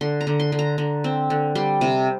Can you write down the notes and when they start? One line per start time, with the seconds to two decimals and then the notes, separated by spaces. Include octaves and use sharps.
0.01 D3 C6
0.21 A#5
0.27 D3
0.40 C6
0.52 D3
0.59 A#5
0.78 D3
1.04 C4
1.30 D3
1.55 G3 C6
1.81 C3